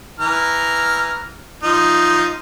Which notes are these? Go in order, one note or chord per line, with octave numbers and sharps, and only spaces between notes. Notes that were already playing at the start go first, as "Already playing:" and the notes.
E3 A#5 F6
F3 D#4